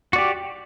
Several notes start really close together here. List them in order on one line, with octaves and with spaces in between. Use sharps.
F#4 D5 G4